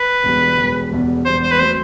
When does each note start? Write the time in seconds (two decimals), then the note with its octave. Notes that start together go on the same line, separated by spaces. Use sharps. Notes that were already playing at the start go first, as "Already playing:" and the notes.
Already playing: B4
0.23 E1 E2 B2 G3
0.57 E1 E2 B2 G3
0.92 E1 E2 B2 G3
1.25 E1 E2 B2 G3 C5
1.43 C5
1.51 B4
1.59 F#3 A3 C4 C5